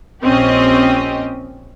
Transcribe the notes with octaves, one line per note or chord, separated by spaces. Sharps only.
A#1 C4 C#4 G4 D#5